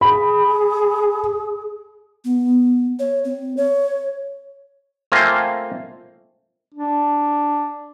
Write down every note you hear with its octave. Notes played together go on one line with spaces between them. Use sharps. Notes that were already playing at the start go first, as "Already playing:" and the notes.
G#4 B5
B3
C#5
C4
C#5
A3 A#3 C4 F4 C5 G#5
D4